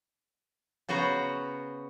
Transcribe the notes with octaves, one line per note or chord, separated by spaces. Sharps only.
C#3 B3 F#4 C5 A#5